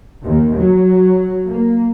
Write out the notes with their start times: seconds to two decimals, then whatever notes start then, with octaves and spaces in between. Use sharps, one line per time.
0.22 D#2
0.57 F#3
1.45 A#3